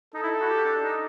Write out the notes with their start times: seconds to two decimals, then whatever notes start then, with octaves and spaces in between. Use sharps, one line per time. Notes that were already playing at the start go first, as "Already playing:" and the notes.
0.14 D#4 A4
0.23 E4
0.41 F#4
0.49 G4
0.66 D4
0.83 D#4